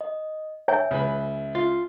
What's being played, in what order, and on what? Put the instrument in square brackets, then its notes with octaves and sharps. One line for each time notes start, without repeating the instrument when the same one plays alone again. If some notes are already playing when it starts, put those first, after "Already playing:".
[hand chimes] D#5
[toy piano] C#5 G#5 [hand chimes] E5
[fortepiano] C#2 B4 B5
[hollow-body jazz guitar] F4